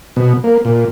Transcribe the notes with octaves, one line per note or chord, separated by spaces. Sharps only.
B2
A#3
A#2